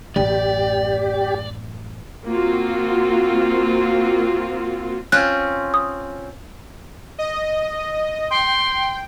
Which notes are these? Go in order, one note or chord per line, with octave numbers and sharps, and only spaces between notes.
A1 F#2 G4 D5
A#3 C4 F4 F#4
C4 C#4 F4 F#6
D#6
D#5
G5 C6